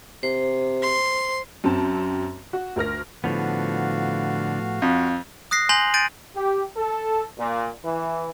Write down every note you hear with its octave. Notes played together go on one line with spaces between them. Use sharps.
C3 C5
C6
F#2 C4 A5
F#4
D2 A#4 F6 A#6
A2 D3 F3 B3 F#4 F5
F2
D#6 F#6 A#6 C7
G#5 C6 G6 A#6 F7 F#7
G6 A6 D7 D#7
G4
A4
A#2
E3